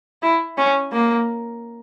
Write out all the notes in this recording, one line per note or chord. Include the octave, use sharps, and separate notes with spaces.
E4
C#4
A#3